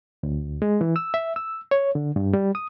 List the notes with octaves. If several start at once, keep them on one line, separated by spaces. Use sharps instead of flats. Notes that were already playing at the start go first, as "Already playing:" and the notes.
D2
G#3
E3
E6
E5
E6
C#5
D3
G2
G3
D#6